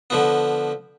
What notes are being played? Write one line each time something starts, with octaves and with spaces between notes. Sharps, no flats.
D3 F3 B3